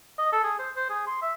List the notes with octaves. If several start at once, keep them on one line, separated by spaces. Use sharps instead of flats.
D#5
A4
G#4
C5
C5
G#4
C6
E5